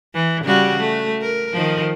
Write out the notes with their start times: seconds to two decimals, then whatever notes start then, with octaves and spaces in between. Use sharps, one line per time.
0.14 E3
0.44 C#3 G3 F#4
0.80 A3
1.21 A#4
1.53 D#3 F3